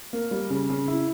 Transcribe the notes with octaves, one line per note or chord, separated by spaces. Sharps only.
A#3
G3
C#3
C#3
E4